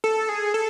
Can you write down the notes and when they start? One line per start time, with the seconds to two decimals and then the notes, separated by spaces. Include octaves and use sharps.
0.04 A4
0.29 G#4
0.54 A4